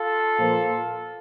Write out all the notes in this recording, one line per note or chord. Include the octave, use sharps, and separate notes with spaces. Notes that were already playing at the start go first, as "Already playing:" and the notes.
Already playing: F4 A4
A#2 F3 A#3